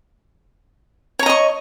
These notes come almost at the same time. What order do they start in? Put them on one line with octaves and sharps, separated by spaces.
C#5 A#5 D#5 C#6